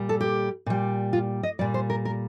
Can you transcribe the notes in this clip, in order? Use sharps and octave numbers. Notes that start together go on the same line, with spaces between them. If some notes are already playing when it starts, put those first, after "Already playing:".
Already playing: A#2 G3
A4
G4
A#2 G3
F4
D#5
A#2 G3 D5
C5
A#4
A#4